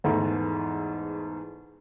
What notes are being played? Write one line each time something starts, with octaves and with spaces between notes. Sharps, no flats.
E2 G#2 E3 A3